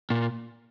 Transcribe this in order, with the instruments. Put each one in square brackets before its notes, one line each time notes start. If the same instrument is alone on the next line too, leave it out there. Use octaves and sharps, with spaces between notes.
[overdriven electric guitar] A#2